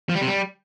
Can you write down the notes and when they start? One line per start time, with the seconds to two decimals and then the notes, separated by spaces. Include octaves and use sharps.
0.09 F3
0.15 G3
0.21 C3
0.28 G3